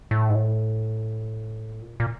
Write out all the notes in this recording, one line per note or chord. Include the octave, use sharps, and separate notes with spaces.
A2
G#2
A2
A#2
A#2